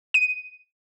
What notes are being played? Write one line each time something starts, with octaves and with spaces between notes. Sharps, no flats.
D#7